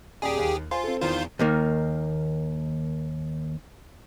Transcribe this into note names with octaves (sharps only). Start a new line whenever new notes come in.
D#1 G4 G#4 D5
D#2
F4 C5 G#5
C4 A4
E2 D#3 E3 F4 C5
D#2 D#3 A#3